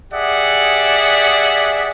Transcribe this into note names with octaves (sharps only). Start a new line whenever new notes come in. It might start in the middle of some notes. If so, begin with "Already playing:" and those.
G4 G#4 D5 E5 F#5